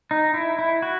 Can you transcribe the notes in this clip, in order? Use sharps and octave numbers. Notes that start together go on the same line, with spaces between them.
D#4
E4
E4
F#4